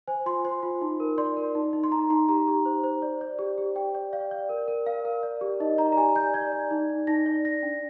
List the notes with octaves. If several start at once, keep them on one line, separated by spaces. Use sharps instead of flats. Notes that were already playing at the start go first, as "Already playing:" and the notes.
C5 G#5
F4 C6
C5 C6
F4
D#4
A#4
D5 C6
A#4
D#4
D#4
C6
D#4 A#5
D#4 C6
G4 A#5
G4
C5
C5
D5
D5
G4
G4
G4 G5
D5
D5 F5
D5
A#4
A#4
A#4 F5
A#4
D5
G4
D#4 D#5
D5 A#5
A#5
G4 G#5
D5 G6
D5 G#6
D5
D#4
D#4
D#4 A#6
D5
D5 A#6
D4